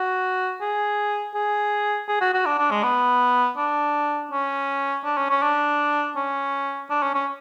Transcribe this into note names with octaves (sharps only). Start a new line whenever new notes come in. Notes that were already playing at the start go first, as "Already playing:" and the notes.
Already playing: F#4
G#4
G#4
G#4
F#4
F#4
D4
D4
G#3
B3
D4
C#4
D4
C#4
C#4
D4
C#4
D4
C#4
C#4